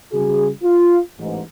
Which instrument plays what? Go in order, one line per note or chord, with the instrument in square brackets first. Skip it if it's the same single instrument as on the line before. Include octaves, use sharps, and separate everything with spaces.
[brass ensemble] C#3 G3 F#4 G#4
F4
A1 G#2